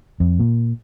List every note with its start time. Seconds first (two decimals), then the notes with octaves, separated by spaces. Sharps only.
0.20 F2
0.39 A#2